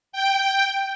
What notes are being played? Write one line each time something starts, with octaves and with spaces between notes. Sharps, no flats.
G5